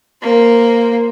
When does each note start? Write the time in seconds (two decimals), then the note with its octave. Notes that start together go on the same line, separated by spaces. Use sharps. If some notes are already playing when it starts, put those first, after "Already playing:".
0.22 A#3 C5